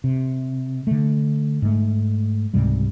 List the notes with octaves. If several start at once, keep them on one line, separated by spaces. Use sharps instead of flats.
C3
D3 A3
G#2 A3
C#2 G#2 C3 G3